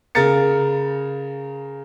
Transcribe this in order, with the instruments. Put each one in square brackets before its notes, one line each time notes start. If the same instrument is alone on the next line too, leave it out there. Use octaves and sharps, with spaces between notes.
[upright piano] C#3 A#4 F5 A#5 A6 C#7